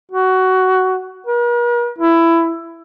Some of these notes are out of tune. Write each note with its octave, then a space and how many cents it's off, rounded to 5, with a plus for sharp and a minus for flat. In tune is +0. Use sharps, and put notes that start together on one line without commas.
F#4 +15
A#4 +45
E4 +15